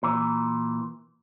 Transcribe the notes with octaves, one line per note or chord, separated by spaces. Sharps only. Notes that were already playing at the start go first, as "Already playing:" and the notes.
A#2 E3